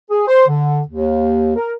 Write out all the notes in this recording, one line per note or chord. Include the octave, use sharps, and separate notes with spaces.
G#4
C5
D3
D#2
A#4